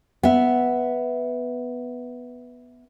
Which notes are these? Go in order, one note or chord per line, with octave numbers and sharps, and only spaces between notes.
B3 E5